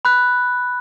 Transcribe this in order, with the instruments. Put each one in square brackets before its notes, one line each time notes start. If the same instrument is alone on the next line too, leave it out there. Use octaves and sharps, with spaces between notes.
[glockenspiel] B5 F#6